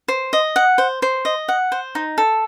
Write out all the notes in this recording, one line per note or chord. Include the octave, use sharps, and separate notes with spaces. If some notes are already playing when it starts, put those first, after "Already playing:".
C5
D#5
F#5
C5
C5
D#5
F#5
C5
D#4
A4